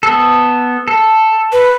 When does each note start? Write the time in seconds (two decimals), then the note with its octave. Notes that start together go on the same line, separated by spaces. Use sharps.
0.03 B3 A4
0.88 A4
1.52 B4